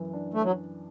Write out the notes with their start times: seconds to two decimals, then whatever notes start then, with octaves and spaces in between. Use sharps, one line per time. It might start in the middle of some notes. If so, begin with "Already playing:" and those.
Already playing: F#2 E3
0.13 D4
0.34 A3
0.43 F#3